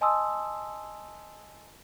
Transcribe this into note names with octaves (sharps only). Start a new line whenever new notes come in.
D#5 G#5 A5 C6 D#6 E6